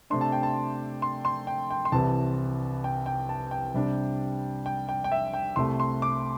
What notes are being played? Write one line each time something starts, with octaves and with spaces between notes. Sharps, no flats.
C3 A3 D4 C6
A5
G5
A5
C6
C6
G5
G5
C6
C2 C3 E3 A5
G5
G5
A5
G5
C3 G3 D4
G5
G5
G5
E5
G5
C2 C3 A3 C6
C6
D6